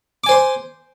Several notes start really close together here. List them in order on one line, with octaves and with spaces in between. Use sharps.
D6 G#5 C5 C6